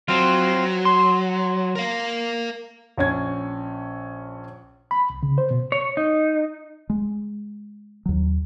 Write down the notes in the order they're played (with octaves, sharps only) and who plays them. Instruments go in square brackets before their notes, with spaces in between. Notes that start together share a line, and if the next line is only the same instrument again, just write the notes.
[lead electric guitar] F#3 [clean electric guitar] C4 F4
[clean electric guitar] C6
[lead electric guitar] A#4 F5
[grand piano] A#1 C#4 G#6
[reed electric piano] B5
C2
C#3
C5
B2
[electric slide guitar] C#5
D#4
[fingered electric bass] G#3
D#2 F#3